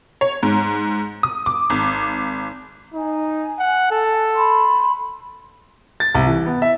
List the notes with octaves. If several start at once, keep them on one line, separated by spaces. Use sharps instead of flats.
C#5
G#2
D#6
D6
G#1
D#4 G#5
F#5
A4
B5 C6
A6
C2
E3
B3
E5